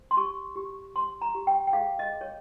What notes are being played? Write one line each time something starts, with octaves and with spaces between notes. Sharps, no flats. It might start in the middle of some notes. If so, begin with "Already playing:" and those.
Already playing: C5
C6
G4 C#6
G4
C5 C6
A#5
G4
G5
G5
G#4 F5
D#5
G#4
C#5